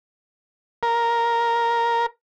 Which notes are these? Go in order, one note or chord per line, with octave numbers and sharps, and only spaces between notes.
A#4